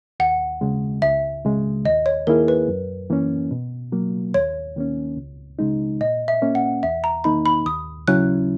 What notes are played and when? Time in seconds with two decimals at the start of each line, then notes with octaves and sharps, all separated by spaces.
0.20 D#2 F#5
0.61 C#3 G#3
1.02 C#2 E5
1.45 C#3 G#3
1.85 D#2 D#5
2.06 C#5
2.27 D#3 A#3 E4 G#4 A#4
2.48 B4
2.68 F#2
3.10 E3 A#3 C#4
3.51 B2
3.92 F#3 A#3
4.34 D#2 C#5
4.76 D#3 A#3 C#4
5.17 C#2
5.59 C#3 G#3 D#4
6.01 A#2 D#5
6.28 E5
6.42 A#3 C#4
6.55 F#5
6.83 E2 E5
7.04 A#5
7.24 D#3 A#3 D#4 B5
7.46 B5
7.66 D#2 D#6
8.08 C#3 F#3 C#4 E4 F#6